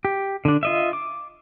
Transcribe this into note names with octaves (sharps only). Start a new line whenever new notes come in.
G4
D3 D4
F4 D#5 E5
D6